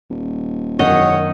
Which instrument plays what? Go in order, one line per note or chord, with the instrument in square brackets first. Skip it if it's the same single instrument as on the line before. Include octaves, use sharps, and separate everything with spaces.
[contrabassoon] D#1
[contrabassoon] E1 [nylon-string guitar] F#2 D#3 [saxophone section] C#5 F#5 [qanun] D#5